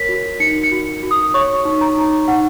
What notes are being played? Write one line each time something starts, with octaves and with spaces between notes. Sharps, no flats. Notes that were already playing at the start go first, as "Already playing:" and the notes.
Already playing: A#4 C#5 B6
F#4
D#4 C#7
C#7
F#4
F#4
D#6
C#5 C#6
D#4
A#5
D#4
D#4 F#5